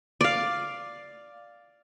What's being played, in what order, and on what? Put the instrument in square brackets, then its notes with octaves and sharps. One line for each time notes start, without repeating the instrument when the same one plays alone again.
[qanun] D5 F5